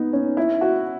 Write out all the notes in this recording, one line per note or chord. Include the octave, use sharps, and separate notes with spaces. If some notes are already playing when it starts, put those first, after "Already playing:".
Already playing: B3 D#4
C#4
E4
F#4